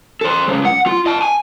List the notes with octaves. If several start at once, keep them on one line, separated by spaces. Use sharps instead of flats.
A4 C5
C#3 G#3
F#5
F4
D#5 A5
G#5